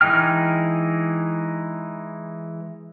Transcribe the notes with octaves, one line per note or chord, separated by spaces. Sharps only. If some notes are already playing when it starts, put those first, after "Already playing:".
E3 G#3 D#4 G5 F6